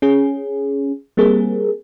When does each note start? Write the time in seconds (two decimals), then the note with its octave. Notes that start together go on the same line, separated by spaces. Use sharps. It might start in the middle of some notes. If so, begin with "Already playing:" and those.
0.02 C#4 G#4
1.17 G3 A#3 C4 G#4 A#4